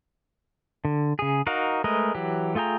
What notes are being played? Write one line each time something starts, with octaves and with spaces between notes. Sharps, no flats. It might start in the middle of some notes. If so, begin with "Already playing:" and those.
D3
C#3 G#4
D#4 F#4 A#4 F5
G#3 A3 A#4 B4 D#5
E3 F#3 G4
A3 F4 G#4 G5 A#5